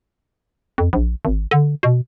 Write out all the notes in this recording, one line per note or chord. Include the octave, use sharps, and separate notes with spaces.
F2
A#1
G#1
D3
B2